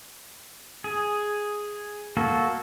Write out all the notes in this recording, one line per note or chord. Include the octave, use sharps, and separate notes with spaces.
G#4
A#3 F#4 A4